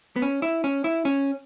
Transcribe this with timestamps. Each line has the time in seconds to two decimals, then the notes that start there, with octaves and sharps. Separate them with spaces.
0.16 B3
0.22 C#4
0.42 E4
0.64 C#4
0.84 E4
1.05 C#4